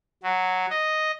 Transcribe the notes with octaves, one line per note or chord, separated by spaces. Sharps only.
F#3
D#5